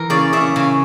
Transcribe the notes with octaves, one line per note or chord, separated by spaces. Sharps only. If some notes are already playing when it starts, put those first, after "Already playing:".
Already playing: E3 A#4
C#3 D5
C#3 E5
C#3